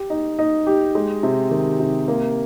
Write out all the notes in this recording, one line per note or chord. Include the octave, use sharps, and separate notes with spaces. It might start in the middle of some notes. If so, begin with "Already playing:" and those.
Already playing: G4
D#4
D#4
G4
G#3
C3
D#3
C3
A#3